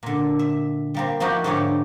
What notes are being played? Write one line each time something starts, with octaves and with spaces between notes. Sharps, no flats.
A#2 D3
E5
G3 A#3 C4
F3 D#4 E4 F#4 G4 A#4
G#2 D3 D#4 G4 C#5 G5